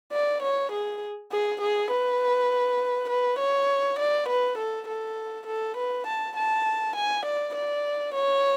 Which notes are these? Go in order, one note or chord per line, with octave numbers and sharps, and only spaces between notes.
D5
C#5
G#4
G#4
G#4
B4
B4
C#5
D5
B4
A4
A4
A4
B4
A5
A5
G#5
D5
D5
C#5